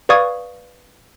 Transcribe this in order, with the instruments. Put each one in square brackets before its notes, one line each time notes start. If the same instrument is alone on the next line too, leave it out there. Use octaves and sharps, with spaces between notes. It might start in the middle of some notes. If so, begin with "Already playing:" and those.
[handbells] B4 D5 F5 C#6 D#6 G#6